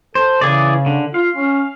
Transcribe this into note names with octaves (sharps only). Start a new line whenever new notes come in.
A4 C5
C#3 E3 G#4 D5
D3
F4 F5
C#4